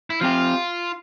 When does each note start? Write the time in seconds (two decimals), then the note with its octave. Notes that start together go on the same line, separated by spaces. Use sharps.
0.10 E4
0.21 F3 C4 F4 G4